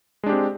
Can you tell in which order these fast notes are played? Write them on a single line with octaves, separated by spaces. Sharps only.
G#3 D4 G4 C4